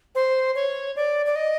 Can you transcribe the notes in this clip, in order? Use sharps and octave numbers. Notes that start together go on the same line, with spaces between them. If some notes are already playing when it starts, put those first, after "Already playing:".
C5
C#5
D5
D5
D#5